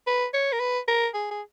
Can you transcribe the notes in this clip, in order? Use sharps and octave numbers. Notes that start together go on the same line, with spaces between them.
B4
C#5
A#4
B4
A#4
G#4
G#4